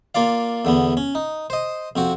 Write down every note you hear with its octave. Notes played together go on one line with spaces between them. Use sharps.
A#3 F4 D5 F5
E2 D3 B3
C#4
D#4
C5 D#5
F2 C4 F#4 C#6